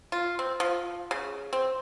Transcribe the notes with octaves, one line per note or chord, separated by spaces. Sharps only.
F4
C4
F3
C#3
C4